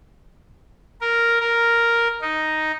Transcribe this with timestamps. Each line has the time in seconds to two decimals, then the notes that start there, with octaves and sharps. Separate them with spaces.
1.01 A#4
1.40 A#4
2.21 D#4